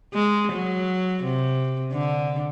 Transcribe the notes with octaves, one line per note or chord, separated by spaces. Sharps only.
G#3
F#3
C3
D3